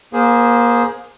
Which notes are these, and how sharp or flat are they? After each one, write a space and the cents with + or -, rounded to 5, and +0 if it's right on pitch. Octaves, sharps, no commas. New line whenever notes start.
A#3 +30 G#4 +0 C5 +0